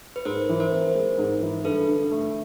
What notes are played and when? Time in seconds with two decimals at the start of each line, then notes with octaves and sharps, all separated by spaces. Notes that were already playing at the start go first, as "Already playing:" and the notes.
0.16 B4
0.25 G#2 A#4 C5
0.49 E3
0.60 A#4 C5
0.72 C4
0.95 G#3
1.18 G#2
1.41 E3
1.64 G2 A4 B4
1.88 D3
2.11 A3